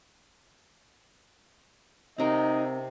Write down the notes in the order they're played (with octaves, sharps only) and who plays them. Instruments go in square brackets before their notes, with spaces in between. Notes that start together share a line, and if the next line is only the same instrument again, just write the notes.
[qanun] C3 A#5 [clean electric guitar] C4 A#4 [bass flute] D#4 [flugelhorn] D#5